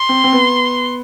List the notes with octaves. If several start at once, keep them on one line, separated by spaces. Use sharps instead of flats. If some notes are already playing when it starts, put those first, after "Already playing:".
Already playing: C6
C4
C4
B3